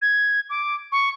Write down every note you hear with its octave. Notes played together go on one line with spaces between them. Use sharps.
G#6
D6
C#6